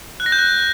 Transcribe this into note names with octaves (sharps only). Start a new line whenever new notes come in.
F#6
A#6
G6
F#6